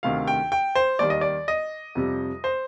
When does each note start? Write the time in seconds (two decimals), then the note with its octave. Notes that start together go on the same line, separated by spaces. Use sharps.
0.03 D2 C3 D#3 F5
0.28 G5
0.52 G5
0.75 C5
0.99 D#2 D#3 G3 D5
1.10 D#5
1.21 D5
1.48 D#5
1.95 F2 C3 G3
2.44 C5